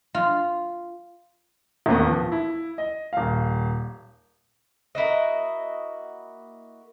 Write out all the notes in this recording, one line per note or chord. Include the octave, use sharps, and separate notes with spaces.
F4
E1 A1 D#2 B3
F3
E4
D#5
D#1 F5
A#3 E4 F#4 D#5